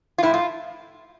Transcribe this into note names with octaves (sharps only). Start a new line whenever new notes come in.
F4
A2 F3 E4
F4